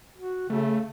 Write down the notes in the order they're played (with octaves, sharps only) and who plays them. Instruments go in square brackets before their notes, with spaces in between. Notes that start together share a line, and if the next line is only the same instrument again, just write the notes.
[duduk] F#4
[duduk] C#3 [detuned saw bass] A3